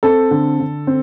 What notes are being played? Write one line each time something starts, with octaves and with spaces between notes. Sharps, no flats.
C4 A4
D3
D3
C4